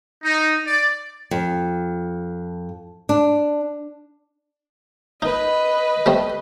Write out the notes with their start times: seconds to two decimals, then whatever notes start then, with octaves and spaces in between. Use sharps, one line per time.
0.24 D#4
0.67 D5
1.31 F2
3.09 D4
5.22 D#4 B4 D#5
6.06 G3 A3 C4